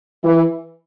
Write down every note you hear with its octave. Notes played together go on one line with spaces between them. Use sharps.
E3